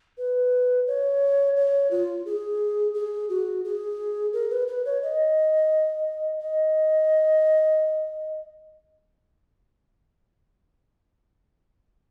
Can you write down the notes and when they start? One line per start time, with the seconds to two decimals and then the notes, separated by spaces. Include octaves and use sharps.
0.18 B4
0.87 C#5
1.57 C#5
1.91 F4
2.25 G#4
2.94 G#4
3.29 F#4
3.64 G#4
4.33 A#4
4.50 B4
4.68 B4
4.85 C#5
5.02 D#5
6.41 D#5